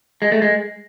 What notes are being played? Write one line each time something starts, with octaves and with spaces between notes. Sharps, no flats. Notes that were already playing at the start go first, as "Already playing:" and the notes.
G#3
A3
G#3